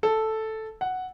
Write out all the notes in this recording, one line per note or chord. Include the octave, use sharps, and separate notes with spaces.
A4
F#5